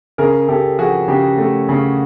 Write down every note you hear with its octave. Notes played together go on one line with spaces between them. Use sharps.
C#3 G#4 A#4
C#3 G4 A4
F3 F#4 G#4
C#3 G4
A3
C#3